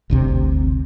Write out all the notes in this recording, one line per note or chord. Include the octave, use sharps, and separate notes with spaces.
G1 D2 C3